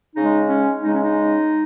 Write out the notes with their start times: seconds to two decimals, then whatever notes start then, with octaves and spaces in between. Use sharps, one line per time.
0.15 C#3 G#3 D#4
0.48 C#4
0.82 C#3 G#3 D#4
0.93 C#4
1.04 D#4